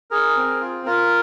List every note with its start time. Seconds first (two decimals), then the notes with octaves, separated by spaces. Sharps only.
0.11 G#4 A#4
0.37 C4
0.61 F4
0.86 F4 A#4